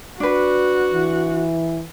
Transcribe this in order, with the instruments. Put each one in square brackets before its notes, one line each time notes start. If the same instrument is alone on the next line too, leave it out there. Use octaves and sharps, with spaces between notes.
[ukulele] D4 B4 [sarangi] F#4
[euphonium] E3